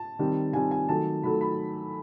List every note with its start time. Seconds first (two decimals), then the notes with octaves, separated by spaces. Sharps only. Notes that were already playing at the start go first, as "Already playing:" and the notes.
Already playing: A5
0.19 D#3 G3 C4
0.53 D#3 G3 C4 G#5
0.71 G#5
0.89 D#3 F#3 A3 A5
1.23 D#3 F#3 A3 B5
1.41 B5